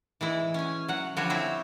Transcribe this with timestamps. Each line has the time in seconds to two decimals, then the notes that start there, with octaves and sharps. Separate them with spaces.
0.21 E3 G#3 E4
0.54 C#4 G#5
0.88 F#3 F#5
1.16 D3 F3 G3 F#4 C#5
1.30 C4 E4 C5 C#5 E5